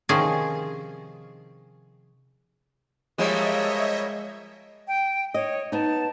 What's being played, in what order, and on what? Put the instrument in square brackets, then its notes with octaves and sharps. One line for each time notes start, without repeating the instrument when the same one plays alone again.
[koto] C3 D#3 F3 C#4 G#4
[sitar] F3 G3 A#3 [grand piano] G#3 [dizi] C#5 [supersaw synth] D#5 E5
[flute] G5
[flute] C#5 [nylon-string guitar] D#5
[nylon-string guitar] B3 D#4 [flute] A5